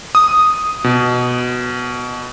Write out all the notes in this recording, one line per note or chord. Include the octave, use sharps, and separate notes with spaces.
D#6
B2